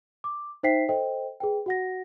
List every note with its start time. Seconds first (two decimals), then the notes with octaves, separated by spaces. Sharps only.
0.24 D6
0.63 D#4 C5 E5 G5 B6 C7
0.89 A4 C5 D#5 G5
1.40 G#4 B4 G5
1.66 F#4 F#5 A#6